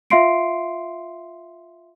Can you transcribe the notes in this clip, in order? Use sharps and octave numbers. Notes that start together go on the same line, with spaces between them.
F4 E5 F5 C6 C7 D7